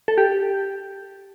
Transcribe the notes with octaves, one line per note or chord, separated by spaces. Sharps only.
A4
G4